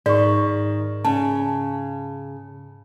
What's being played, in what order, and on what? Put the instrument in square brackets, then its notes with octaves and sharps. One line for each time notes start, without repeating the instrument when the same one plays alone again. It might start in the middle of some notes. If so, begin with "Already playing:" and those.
[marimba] G#2 [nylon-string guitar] D#3 [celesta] D5 C#6
[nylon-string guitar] C#3 [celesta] A5